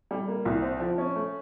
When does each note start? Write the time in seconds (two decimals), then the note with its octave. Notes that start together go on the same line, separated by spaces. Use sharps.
0.11 G3
0.28 A#3
0.45 C2
0.62 C4
0.80 F3
0.98 C#4
1.15 A3